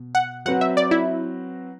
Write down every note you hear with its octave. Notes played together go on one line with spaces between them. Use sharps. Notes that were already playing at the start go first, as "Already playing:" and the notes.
Already playing: B2
F#5
F#3 C4 F#4 B4 F#5
E5
D5
E4